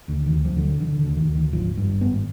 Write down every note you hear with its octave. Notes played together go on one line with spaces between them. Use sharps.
D2 D3
D#3
D2
F3
D3
F#3
D3 E3
D3
D2
D#3
D2
D#3
G#1 F3
G2
G#1 B3